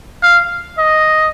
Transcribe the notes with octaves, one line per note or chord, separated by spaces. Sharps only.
F5
D#5